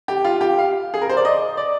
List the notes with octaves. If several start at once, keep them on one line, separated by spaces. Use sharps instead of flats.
G4
F4
G4
F5
G#4
A#4
C5
D5
D#5
D5